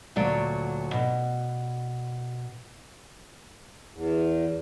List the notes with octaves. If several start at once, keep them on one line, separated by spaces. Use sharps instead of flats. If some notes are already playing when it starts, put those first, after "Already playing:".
D2 A#2 F#3 D5
B2
E2